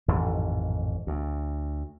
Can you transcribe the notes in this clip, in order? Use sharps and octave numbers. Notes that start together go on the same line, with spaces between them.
A1 F2 G#2 D#3
D2